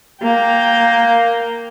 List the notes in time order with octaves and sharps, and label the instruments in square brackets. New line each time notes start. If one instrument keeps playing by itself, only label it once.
[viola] A#3 G5